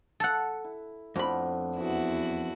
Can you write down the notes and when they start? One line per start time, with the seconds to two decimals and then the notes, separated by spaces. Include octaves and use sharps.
0.20 A4 F#5
0.64 E4
1.16 F2 A2 B3 D4 B5
1.76 E2 E3 B3 E4 F#4